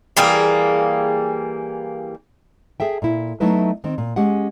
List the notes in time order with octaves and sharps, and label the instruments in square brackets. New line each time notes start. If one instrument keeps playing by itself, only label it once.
[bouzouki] E3 G3 A#3 G#4
[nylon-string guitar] G#4 A4 E5 G5
A#2 E4
F#3 A3 B3 D#4 E4 B4
D#3 C4
A#2
G#3 C#4 G4 F#5